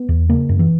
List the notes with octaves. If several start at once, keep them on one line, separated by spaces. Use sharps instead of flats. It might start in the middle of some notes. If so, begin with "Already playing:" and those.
Already playing: B3
E2
C#3 A#3
F#2
E3